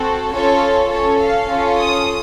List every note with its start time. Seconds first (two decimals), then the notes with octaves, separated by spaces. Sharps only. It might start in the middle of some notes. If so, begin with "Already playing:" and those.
Already playing: C4 F#4 A4
0.32 C#4 F4 A4 C#5
0.91 C#4 A4 C#5
1.21 F5
1.49 C#4 F4 A4
1.79 D#6